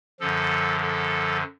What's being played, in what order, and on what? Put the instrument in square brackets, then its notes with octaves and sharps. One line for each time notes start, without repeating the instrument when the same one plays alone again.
[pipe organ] F#2 D3 F3 A4
A4